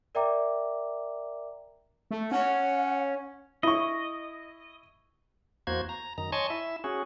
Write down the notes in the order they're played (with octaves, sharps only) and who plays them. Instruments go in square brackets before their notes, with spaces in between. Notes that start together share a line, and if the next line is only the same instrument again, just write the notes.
[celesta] A#4 D5 E5 G5 A#5 D6
[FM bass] A3
[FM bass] C#4 [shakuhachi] F#5
[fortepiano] E4 C#6 [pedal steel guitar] D#5
[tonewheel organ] E2 A#3 F#4 C5 G#6
A#5
F#2 D#3 A#5
C#5 D#5 G#5 A5 C6 C#6
E4 E5
C#4 F#4 G#4